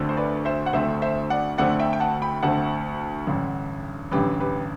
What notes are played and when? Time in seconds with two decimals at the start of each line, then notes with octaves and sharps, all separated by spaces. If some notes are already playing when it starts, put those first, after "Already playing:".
Already playing: D2 D3 A3 C4
0.09 C5
0.17 B4 D5
0.45 C5 E5
0.66 F#5
0.73 D2 D3 A3 C4 C5 E5
1.02 C5 E5
1.30 D5 F#5
1.58 D2 D3 A3 C4 D5 F#5
1.79 E5 G5
1.93 G5
2.00 F#5 A5
2.22 G5 B5
2.43 D2 D3 A3 C4 F#5 A5
3.27 A1 G2 D3
4.11 A1 G2 D3 G4 B4
4.40 G4 B4